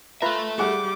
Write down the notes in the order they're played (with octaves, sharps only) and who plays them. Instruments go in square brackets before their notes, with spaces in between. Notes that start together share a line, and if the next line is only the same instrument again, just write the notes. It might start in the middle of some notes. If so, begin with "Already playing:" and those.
[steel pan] F4 B4 A#5 [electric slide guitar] A4 E5
[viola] G3 D6 [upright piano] G#4 F#5